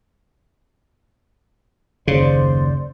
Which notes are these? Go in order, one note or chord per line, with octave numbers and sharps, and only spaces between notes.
F#1 D#2 C#3 C5 D5 C6